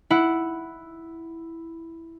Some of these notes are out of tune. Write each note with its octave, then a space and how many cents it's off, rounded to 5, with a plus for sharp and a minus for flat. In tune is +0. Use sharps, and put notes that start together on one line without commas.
E4 +0 F#5 +0